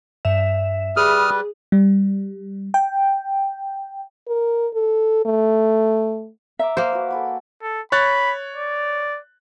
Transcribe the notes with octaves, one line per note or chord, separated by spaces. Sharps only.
G2 E5 E7
G3 G#4 B4 D#6 F6
G3
G5
A#4
A4
A3
E5 A#5 D6
A#3 C5
F#4 B4
A4 G#5 B5
A4
C#5 B5 F#6 A6
D5